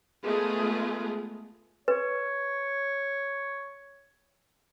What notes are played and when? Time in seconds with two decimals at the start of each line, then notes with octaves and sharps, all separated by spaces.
0.23 G#3 A3 B3 F4 G#4
1.88 B4 C#5